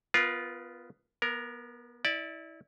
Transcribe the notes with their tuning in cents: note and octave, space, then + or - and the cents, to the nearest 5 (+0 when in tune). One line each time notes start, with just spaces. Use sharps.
B3 +10 F4 +0 A#4 +35
B3 -30 A#4 +0
E4 -25 D5 +0